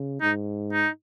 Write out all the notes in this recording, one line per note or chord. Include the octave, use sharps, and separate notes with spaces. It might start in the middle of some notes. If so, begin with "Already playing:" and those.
Already playing: C#3
G#2 D#4
D#4